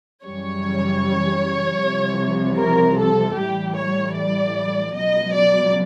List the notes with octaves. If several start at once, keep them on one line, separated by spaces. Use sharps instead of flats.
F#2 C#3 E3 G3 C#5
C2 C3 F3
A#4
A4
A2 E3 G3 G4
C#5
D5
C#2 B2 F#3 D#5
D5